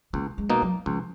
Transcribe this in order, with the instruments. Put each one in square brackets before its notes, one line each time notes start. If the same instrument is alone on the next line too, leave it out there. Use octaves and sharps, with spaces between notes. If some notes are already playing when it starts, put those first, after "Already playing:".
[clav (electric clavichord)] C#2 [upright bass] A#3
[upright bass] G#3
[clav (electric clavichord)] B2 A#3 D#4
[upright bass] F#3
[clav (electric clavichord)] C#2 [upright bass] F3